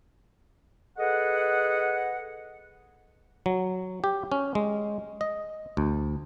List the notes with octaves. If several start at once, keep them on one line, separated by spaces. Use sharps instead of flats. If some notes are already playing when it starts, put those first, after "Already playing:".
G#4 A4 B4 D#5 F#5
F#3
G4
C#4
G#3
D#5
D2